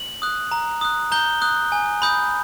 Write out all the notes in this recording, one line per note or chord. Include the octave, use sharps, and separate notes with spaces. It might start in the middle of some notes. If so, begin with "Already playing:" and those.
Already playing: F#7
D#6 F#6
A#5
D#6 F#6
A#5 G6 G7
D#6 F#6
G#5
B5 D#6 G6